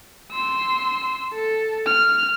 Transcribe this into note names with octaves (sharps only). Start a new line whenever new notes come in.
C6 E6
A4
F6